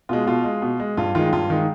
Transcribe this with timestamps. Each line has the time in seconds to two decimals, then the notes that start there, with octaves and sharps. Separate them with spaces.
0.09 B2 G#3 F4
0.27 B2 F4
0.44 G#3
0.62 B2
0.80 G#3
0.97 G2 F4
1.15 D#3 G#3 F4
1.33 G2 F4
1.50 D#3 G#3